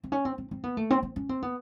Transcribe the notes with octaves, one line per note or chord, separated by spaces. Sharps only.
C4
C#4
C4
C4
C4
B3
A3
C4
C4
C#4
C4
B3